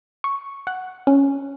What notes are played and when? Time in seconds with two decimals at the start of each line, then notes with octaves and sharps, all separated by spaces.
0.24 C#6
0.67 F#5
1.07 C#4